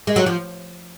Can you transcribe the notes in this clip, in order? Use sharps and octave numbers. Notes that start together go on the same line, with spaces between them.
G#3
F#3
F3